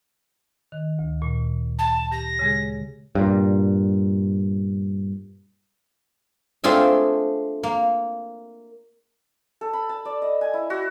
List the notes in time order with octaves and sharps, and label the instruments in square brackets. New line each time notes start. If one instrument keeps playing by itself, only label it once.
[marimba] D#3
D2
A#2
[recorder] A5
[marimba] G4 [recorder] A#6
[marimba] C#3 G#3 G#4
[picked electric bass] G2 A#2
[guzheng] A3 C4 D4 F4 G#4 E5
A#3
[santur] A4
B5
A5
D5
D#5
G#5
E4
F#4